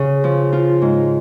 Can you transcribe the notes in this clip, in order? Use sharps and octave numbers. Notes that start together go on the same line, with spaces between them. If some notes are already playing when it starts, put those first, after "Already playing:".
Already playing: C#3
F3
F4
G#2